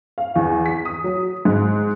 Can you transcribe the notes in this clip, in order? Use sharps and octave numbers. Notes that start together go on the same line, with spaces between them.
F5
E2
B6
D#6
F#3
G#2